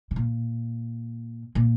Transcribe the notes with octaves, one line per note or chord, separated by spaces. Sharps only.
C#3
A#2
A#2